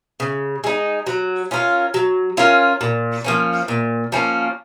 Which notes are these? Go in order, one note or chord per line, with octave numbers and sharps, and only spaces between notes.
C#3
G#3 D#4
F#3
C#4 F4 A#4
F#3
C#4 F4 A#4
A#2
F3 A#3 C#4
A#2
F3 A#3 C#4